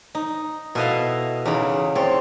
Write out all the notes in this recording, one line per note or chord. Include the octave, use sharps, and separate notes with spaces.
D#4
B2 E4 A4 B4 D#5 F5
E2 C#3 D#4 B5
C4 C#5 D5